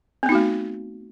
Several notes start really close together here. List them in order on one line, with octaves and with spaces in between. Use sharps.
C4 B3 D#4 F#4 A3